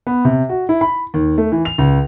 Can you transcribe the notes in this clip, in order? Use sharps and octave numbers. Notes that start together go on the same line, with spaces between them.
B3
C3
F#4
E4
B5
D#2
A3
E3
F7
C#2